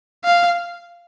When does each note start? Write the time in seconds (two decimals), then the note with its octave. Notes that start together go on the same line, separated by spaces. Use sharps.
0.25 F5